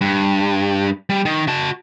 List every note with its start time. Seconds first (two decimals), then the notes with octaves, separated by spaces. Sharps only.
0.01 G2
1.09 G3
1.25 D#3
1.48 F#4 A5